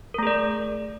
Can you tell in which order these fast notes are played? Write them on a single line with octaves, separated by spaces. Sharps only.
A#4 A3 G#4 D5